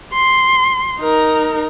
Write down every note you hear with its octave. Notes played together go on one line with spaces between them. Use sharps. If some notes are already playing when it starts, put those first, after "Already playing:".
C6
D#4 A#4